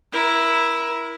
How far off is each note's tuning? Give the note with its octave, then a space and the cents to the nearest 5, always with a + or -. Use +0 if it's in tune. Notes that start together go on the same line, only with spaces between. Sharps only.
E4 +0 A#4 +25